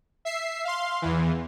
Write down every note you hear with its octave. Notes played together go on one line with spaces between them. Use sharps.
E5 C7
F5 C6
E2 E3